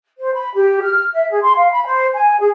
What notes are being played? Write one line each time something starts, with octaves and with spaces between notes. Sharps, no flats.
C5
B5
G4
F6
E5
G#4
C6
F5
B5
C5
G#5
G#4